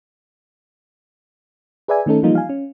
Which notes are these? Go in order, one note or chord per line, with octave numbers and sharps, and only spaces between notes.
G#4 B4 D5 E5 G#5
D#3 A3 C#4 D#4 A4
E3 F3 G3 A#3 D#4 F4
F5 G#5
C#4